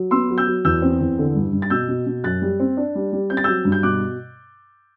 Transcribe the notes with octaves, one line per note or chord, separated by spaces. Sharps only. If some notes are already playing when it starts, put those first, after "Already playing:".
Already playing: F#3
B3 C6 E6
F#3
E6 G6
F#3
E2 E6 G6
C4
E2
D3
G2
G2
A6
B2 E6 G6
B2
B2
F#2 F#6 A6
G3
C4
D4
G3
G3
C4 G6
A6
F#3 E6 G6
G2
G6
B2 D6 F#6